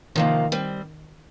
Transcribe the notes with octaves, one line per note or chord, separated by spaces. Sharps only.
C3 D#3 F3 A#3
G3 C4